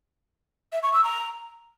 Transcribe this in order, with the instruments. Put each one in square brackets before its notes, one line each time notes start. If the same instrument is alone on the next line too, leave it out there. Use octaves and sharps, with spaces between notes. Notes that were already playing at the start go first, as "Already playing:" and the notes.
[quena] E5
C#6
E6
A#5